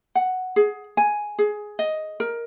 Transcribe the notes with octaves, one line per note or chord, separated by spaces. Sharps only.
F#5
G#4
G#5
G#4
D#5
A#4